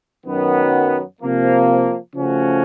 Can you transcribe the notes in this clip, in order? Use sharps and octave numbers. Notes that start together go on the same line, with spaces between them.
F#2 D#3 F#3 B3
C3 F3 A#3
C#3 F3 A3 C#4 F#4